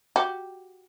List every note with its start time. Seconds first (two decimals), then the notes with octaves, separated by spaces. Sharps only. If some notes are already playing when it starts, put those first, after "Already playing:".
0.16 F#4 G4